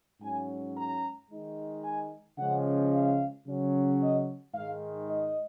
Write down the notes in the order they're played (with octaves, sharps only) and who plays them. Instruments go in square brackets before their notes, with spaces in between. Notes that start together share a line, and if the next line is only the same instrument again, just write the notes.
[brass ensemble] G#2 F#3 C#4 G#5
A#5
D#3 G#3 D#4
G#5
C#3 F3 G#3 C#4 F#5
F5
C#3 F#3 C#4
D#5
G#2 D#3 G#3 F5
D#5